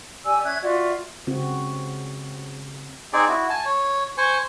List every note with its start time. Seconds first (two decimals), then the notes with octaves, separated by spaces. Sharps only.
0.24 G4 D5 G#5 E6
0.44 C#4 E5 F#6 G#6
0.62 F4 F#4 D5 E5
1.27 C#3 C4 F#4
3.13 C4 D#4 G#4 D5
3.29 E4 F#4
3.50 G#5 A5
3.65 C#5
4.18 C5 G#5 C#6